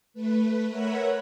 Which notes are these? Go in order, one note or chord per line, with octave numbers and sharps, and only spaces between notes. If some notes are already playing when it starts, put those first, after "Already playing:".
A3 B4
A#4 B4 C#5 E5 F#5 B5